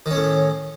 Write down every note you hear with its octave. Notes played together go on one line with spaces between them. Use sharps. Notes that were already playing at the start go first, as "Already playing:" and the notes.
A2 D#3 C#4